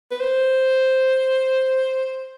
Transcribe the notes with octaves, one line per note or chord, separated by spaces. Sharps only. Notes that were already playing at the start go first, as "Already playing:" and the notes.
B4
C5